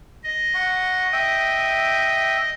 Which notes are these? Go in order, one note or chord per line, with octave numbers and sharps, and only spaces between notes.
D#5
F#5 C#6
E5 G5 D#6